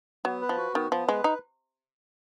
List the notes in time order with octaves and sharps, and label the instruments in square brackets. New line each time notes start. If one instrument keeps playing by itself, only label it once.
[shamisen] F#3 [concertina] B3
[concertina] B4
[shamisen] F3
[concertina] F#4
[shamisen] D#3 [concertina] B3
[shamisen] F3 [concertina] B3
[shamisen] G#3 [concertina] B4
[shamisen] D#4